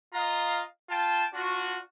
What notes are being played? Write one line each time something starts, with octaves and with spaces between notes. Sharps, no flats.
F4 D#5 F5 A#5
F4 G5 A5
D4 F4 F#4